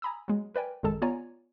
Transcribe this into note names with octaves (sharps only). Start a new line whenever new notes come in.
G#5 A#5 B5 D#6 E6
F#3 G#3
A#4 B4 D5 G5 G#5
A1 F#2 D#3 G#3 A4 A5
B3 F4 C#5 D5 G#5 A#5